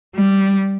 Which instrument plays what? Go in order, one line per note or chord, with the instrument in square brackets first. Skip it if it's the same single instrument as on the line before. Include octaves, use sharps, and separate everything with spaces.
[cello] G3